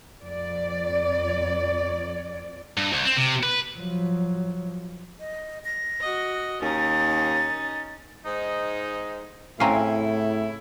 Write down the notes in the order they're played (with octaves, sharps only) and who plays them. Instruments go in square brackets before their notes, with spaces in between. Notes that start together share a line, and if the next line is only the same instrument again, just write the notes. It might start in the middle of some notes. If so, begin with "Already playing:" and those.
[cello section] F2 D5
[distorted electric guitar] G2
C2
C4
C3
B4
[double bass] F3 F#3
[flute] D#5
A#6
[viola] F#4 D#5
[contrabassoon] D#2 [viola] C#4 D#4 [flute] A6
[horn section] G#2 D#4
[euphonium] A2 [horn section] C#3 E4 [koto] C4 C#4 [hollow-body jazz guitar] F5 G#5 A#5